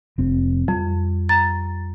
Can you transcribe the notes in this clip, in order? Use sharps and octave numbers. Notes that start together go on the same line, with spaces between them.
F1 C4
F2 G3
A#5 A6